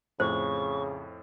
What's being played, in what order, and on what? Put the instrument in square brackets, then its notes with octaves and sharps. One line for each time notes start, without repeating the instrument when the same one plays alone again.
[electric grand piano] F2 A2 [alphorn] C#3 [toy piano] C5 [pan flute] C#6